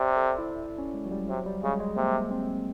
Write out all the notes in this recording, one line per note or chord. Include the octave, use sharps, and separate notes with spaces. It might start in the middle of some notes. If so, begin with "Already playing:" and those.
Already playing: C3 D5
A4
E4
C#4
G#3
F#3
G3
C3 F#3
G3
C#3 G#3
G#3
C3 A#3
C4